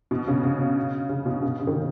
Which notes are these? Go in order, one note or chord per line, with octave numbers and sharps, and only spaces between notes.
B2
C#3
C#3
C#3
B2
C#3
C#3
D#3